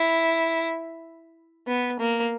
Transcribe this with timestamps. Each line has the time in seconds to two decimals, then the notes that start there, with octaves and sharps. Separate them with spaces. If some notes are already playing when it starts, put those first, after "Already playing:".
Already playing: E4
1.67 B3
2.00 A#3